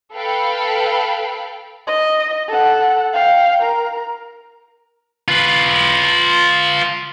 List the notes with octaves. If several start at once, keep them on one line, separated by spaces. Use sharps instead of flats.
A4 B4 F5 G5 B5
D#5
A4 F#5
F5 G5
A#4
F4 B4